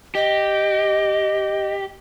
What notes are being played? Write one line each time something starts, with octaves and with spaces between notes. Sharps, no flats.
G4 D#5